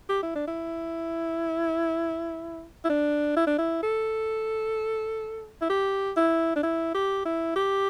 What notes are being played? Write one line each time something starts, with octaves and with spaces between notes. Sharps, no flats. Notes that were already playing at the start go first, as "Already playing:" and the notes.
G4
E4
D4
E4
E4
D4
E4
D4
E4
A4
E4
G4
E4
D4
E4
G4
E4
G4